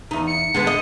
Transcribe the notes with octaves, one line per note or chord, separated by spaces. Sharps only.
E2 D#4
C#7
D3 G#3 B3
D#5